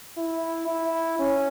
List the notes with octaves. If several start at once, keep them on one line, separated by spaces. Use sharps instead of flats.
E4
E4
C#4